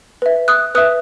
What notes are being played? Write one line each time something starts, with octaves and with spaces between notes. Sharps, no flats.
B4 E5
D#6 F#6
B4 E5 D#6 F#6